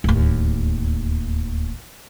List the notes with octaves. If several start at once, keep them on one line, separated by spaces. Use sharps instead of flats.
D1 D#2